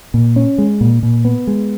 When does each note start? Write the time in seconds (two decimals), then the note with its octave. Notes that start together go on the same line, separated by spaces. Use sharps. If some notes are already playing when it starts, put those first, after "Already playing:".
0.14 A#2
0.36 C#4
0.58 G#3
0.81 A#2
1.03 A#2
1.25 B3
1.47 G#3